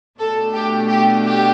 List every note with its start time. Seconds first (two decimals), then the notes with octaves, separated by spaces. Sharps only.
0.19 B2 A3 D4 A4
0.54 G4
0.88 G4
1.23 G4